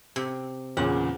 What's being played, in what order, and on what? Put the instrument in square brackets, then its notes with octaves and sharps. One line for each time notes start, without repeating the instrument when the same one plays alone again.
[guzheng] C3
[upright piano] E2 A#2 C#3 [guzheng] F#5